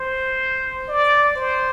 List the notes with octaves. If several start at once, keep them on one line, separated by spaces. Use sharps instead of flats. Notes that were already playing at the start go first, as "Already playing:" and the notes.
Already playing: C5
D5
C5